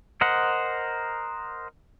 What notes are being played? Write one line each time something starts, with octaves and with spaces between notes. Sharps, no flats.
A#4 C5 D#5 F#5